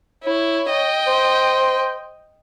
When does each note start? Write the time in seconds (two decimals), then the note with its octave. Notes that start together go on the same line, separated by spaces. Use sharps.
0.24 E4 C#5
0.70 D#5 G5
1.07 C5